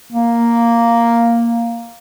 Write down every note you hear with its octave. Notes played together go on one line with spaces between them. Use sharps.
A#3